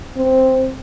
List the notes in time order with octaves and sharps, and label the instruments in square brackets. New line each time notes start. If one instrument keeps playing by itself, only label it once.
[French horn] C4